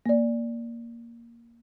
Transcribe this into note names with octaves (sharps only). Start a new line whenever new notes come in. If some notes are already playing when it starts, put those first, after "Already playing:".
A#3 D5